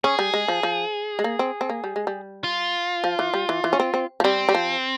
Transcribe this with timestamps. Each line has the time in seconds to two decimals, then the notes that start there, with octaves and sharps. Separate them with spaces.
0.04 C#4 G#4
0.19 G3
0.34 G#3
0.48 F3
0.63 F3
1.19 G#3
1.24 A#3
1.39 C4
1.61 C4
1.69 A#3
1.84 G3
1.96 G#3
2.07 G3
2.44 F4
3.04 F3
3.19 E3
3.34 G3
3.49 E3
3.64 E3
3.73 C#4
3.80 C4
3.94 C4
4.20 F3
4.24 G3 C4
4.49 G3
4.55 F3